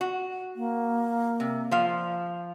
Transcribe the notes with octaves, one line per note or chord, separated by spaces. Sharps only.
F#4
A#3
C3
F3 F5